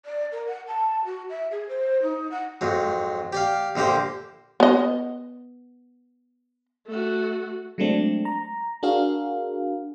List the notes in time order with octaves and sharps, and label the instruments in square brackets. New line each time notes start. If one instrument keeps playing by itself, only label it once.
[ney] D5
A#4
F#5
A5
F#4
E5
G#4
C5
D#4
F#5
[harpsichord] F2 G#2 F#3
G4 D5 F5
A#1 D3 A#3 G4 C5
[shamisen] B3 D#5
[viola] A3 F#4
[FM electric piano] F#3 G#3 A3 C4 D4
A#5
D4 F#4 G#4 A#4 F5